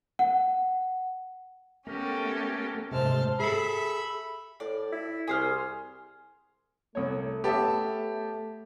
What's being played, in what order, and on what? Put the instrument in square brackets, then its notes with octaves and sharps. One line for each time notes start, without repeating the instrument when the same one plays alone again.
[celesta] F#5
[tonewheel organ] A3 B3 A#4 [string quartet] C#4 G4 A4
[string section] G#2 C5 [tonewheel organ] C3 G#3 A3 [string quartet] A5 F6
[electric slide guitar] G#4 A4 [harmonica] E5 B5
[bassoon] A2 [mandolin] D5
[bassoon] E4
[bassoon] C2 [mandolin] G#4 C5 F6
[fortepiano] C2 C#5 [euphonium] A3
[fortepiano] B3 C#4 E5 [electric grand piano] G4 A5